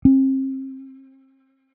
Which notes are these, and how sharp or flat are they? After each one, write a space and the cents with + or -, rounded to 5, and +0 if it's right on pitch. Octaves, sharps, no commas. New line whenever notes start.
C4 +35